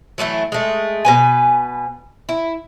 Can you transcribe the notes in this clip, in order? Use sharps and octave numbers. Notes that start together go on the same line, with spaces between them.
E3 F#3 A3 E4
G#3 A3
B2 B4 G#5
E4